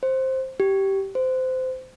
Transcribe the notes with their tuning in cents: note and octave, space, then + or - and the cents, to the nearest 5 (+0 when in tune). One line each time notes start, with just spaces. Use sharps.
C5 +10
G4 -15
C5 -20